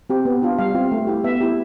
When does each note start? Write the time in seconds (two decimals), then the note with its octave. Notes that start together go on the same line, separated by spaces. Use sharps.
0.10 C4 G4
0.25 B3
0.42 D4 F4
0.58 G3 F5
0.75 C4 F4
0.92 A3
1.07 E4 G4
1.24 B3 E5
1.41 E4 G4